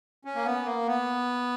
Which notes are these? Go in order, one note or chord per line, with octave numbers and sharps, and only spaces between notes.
C#4
A#3
B3
A#3
B3